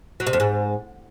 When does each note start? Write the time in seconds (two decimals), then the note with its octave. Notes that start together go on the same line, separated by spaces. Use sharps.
0.20 F#3
0.27 C3
0.33 F2
0.40 G#2